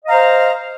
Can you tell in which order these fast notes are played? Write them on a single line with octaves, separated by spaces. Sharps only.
D#5 F5 A#5 C5